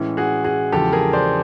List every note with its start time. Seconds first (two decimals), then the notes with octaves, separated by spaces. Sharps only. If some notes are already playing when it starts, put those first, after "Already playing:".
Already playing: A2 E3 G#3 C#4 E4
0.17 F#4 G#4
0.44 F#4 G#4
0.72 E2 C#3 F3 G#3 G4 A4
0.92 G#4 A#4
1.13 C5 D5